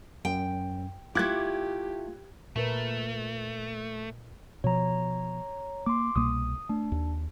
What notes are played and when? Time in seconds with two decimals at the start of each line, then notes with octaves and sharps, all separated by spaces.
0.25 F#2 G5
1.15 A3 E4 F4 G4 D6 F#6 G#6
2.56 A#2 A3 A#4 B4
4.64 B2 F3 C#5 A#5
5.86 A#3 C6 D6
6.16 C2 B2 A#3 D#6
6.69 A3 D4
6.92 D#2